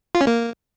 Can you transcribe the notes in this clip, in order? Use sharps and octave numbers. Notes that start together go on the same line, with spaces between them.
F4
C#4
A#3